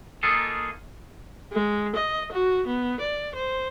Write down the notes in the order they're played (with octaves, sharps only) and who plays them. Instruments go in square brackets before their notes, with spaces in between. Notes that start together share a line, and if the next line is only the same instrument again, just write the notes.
[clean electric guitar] A#3 D#4 F4 G#4 A4
[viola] G#3
D#5
F#4
B3
D5
C5